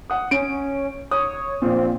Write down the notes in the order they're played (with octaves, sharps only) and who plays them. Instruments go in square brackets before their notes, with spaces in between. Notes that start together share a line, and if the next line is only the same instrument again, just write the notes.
[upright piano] F#5 D#6
[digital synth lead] C#4 [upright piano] D7
[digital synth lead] C#5 [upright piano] D#6
[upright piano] A#1 A#2 [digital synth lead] C4